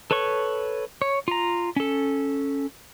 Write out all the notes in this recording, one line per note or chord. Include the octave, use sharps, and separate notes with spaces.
A4 B4 C#5 C#6
C#5
F4 A#5
C#4 A4